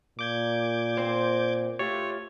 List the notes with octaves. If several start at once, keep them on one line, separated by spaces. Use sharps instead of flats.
A#2 D6 G6 G#6
C4 C5
A3 F4 G4 C#5